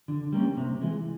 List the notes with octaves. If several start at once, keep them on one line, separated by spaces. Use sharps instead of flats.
D3
G3 A#3 C#4
C3
E3 G#3